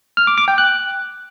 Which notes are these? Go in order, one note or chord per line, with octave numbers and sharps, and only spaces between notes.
F6
D6
D6
G5
F#6